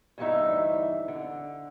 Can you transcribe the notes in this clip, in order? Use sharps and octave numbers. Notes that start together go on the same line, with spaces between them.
D2 G2 D3 E3 D#4 E5
D3